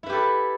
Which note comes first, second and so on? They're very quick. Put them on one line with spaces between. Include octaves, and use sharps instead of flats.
E4 B4 G4 A4